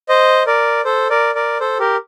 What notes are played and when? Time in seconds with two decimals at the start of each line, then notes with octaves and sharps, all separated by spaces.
0.09 C5 D#5
0.47 A#4 D5
0.85 A4 C5
1.10 A#4 D5
1.35 A#4 D5
1.60 A4 C5
1.79 G4 A#4